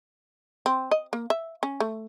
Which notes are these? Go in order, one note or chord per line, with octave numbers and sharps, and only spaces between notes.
C4
D#5
A#3
E5
C#4
A3